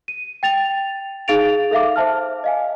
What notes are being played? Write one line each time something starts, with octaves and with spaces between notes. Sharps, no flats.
D#7
G5 A6 F7
D#4 G#4 F5 A6 D7 F7
A4 E5 F5 D6
C5 E5 A5 F6
D#5 F5 G#5